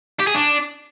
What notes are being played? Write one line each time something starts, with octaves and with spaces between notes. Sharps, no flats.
G4
G#4
D4